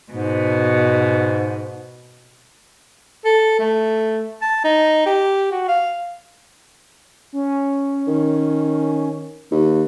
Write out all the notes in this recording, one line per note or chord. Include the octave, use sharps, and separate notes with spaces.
G#2 B2
A4
A3
A5
D#4
G4
F#4
F5
C#4
D#3
D#2